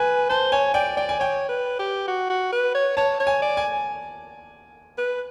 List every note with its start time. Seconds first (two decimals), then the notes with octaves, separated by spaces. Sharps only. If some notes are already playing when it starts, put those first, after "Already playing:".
Already playing: B4 G#5
0.29 C5 A5
0.52 C#5 G#5
0.74 D5 G5
0.97 D5 G5
1.09 G#5
1.19 C#5 G5
1.49 B4
1.79 G4
2.08 F#4
2.30 F#4
2.52 B4
2.75 C#5
2.97 C#5 A5
3.20 C#5
3.27 G#5
3.42 D5
3.57 G#5
4.98 B4